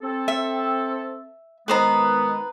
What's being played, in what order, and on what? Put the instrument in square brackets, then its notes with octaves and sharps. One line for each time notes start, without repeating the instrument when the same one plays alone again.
[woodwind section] C4 A4
[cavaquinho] E5
[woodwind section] D#3 G#3 B3 [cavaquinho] B4 C5 A#5